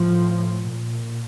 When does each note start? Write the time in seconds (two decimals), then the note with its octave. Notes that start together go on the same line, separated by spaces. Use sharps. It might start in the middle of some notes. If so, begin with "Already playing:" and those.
Already playing: A2 F3
0.68 A#2